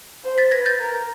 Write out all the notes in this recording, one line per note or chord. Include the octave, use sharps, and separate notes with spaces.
C5
A6 B6
B4 G#6 A#6
G6 A6
A#4